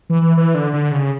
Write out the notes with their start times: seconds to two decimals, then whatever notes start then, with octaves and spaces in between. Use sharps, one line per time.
0.10 E3
0.37 E3
0.55 D3
0.73 D3
0.92 C#3